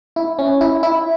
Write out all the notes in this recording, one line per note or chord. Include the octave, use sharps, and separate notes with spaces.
E4
C#4
E4
E4